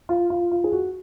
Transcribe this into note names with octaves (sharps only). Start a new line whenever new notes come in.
F4
F4
F4
G#4
F#4